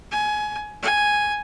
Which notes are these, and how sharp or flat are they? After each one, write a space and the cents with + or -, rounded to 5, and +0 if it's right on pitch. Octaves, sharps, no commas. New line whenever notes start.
G#5 +20
G#5 +0